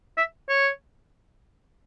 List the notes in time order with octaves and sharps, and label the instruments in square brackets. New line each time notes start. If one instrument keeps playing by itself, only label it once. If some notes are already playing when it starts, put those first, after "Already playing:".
[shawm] E5
C#5